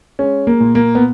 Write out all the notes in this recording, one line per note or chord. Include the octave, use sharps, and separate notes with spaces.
G#3 C#4
A#3
A#2
A#3
B3